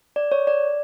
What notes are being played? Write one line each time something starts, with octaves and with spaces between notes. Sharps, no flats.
D5
C#5
D5